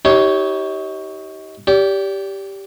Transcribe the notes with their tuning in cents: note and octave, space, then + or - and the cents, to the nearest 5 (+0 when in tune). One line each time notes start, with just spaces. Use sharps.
D#4 +35 G4 -20 C#5 +5
G4 +0 D5 -35